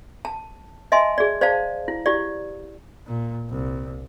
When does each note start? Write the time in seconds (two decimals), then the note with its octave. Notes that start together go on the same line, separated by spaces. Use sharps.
0.25 A5
0.92 D#5 E5 G#5 A5 C6
1.18 G#4 D5
1.41 C5 D5 F5 A5
1.88 E4
2.06 E4 G4 D5
3.07 A#2
3.49 C2